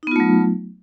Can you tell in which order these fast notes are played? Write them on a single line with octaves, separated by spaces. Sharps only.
D#4 B3 F4 A3 F#3